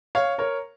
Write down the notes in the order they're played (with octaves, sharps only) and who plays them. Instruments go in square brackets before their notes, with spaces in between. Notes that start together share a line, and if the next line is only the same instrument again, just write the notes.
[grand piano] C#5 F5
A#4 C#5